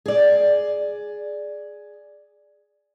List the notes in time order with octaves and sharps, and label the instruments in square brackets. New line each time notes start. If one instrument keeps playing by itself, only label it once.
[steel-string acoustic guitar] G#4 D5